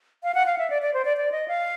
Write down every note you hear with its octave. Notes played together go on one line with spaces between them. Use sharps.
F5
F#5
F5
E5
D5
D5
C5
D5
D5
D#5
F5